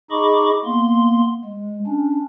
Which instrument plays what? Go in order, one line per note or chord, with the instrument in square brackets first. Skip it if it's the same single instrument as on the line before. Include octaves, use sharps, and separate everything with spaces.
[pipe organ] D#4 G#4 D#5 B5 C#6 D6
A#3 B3 C6
G#3
C#4 D4